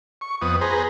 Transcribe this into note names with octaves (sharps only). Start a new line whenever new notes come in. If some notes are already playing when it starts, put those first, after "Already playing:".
C#6
F2 B3 D#6
G#4 B4 C5 A#5